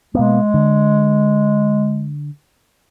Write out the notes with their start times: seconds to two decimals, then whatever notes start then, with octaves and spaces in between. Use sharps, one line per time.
0.15 B2 G#3 A#3 B3
0.54 D3